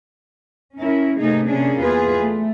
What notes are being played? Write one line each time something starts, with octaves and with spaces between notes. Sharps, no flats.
C#4 E4 A#4
C3 A3 A#3 D#4 G#4
C3 A#3 C#4 D4 G#4
E2 F4 G#4 B4
A3